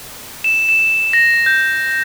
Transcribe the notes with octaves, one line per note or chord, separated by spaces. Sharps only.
E7
E7
A#6
G6